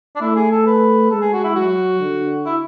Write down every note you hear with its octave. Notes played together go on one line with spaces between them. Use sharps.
D4
A3 E4
G#4
A4
B4
G#3 A4
G#4
F#4
E4
F#3 F#4
D3
E4